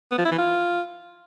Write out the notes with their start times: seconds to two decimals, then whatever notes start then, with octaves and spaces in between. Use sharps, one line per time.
0.12 B3
0.18 F3
0.25 E4
0.32 E3
0.38 F4